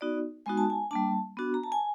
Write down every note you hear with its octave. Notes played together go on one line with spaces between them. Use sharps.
B3 D#4 F#4 D5
G#3 B3 D#4 F#4 G#5
A5
G#5
G3 A#3 D4 A5
B3 D4 F#4
A#5
A5
G#5